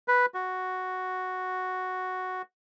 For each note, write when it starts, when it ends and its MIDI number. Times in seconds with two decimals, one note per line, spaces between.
0.08 0.26 71
0.34 2.42 66